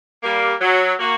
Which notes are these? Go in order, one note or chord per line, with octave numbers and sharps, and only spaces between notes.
G3 A#3
F#3
A#3 F#4